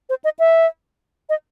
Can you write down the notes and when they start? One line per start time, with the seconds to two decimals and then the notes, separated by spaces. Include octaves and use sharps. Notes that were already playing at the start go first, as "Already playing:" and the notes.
0.09 C5
0.24 D#5
0.39 E5
1.29 D#5